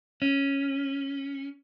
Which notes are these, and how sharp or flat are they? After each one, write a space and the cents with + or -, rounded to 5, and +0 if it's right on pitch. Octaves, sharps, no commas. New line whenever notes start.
C#4 -5